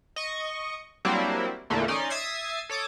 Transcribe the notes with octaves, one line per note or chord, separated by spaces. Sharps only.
D#5 C#6
F#3 G3 A#3 C4 D4 E4
E2 A#2 D3 A3 A#3
C#4 D#4 D5 C6
E5 D#6 G#6 A6 C7
A4 C#5 D6 D#6